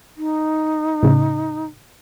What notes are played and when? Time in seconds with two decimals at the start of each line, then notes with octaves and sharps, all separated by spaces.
0.17 D#4
1.03 A2 C#3